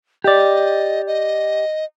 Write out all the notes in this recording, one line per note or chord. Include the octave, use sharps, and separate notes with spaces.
G4 D5 D#5
D#5